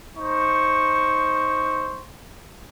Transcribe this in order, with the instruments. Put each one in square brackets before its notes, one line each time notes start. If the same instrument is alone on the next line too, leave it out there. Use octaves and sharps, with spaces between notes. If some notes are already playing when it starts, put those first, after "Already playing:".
[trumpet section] D#4 C5 C#6